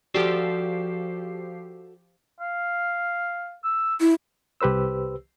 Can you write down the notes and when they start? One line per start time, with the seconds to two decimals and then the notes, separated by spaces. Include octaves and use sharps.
0.14 F3 F#4 G4 A4 D5 C7
2.40 F5
3.64 E6
4.01 E4
4.61 C2 G4 B4 C5 E6